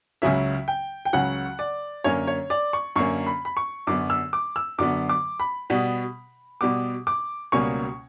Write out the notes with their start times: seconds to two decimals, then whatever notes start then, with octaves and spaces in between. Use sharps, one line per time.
0.22 C#2 C#3 F#3 C#4 E5
0.68 G5
1.05 G5
1.13 C#2 C#3 F#3 C#4 F#5
1.59 D5
2.04 F#2 D3 A#3 C#4 C#5
2.27 C#5
2.50 D5
2.73 C#6
2.96 F#2 D3 A#3 C#4 C#6
3.27 B5
3.45 B5
3.57 C#6
3.87 F#2 D3 F#3 B3 D6
4.10 E6
4.33 D6
4.56 E6
4.78 F#2 D3 F#3 B3 D6
5.09 D6
5.40 B5
5.70 B2 G3 B3
6.61 B2 G3 B3 D6
7.07 D6
7.52 C#2 B2 G3 A#3 C#4 C#6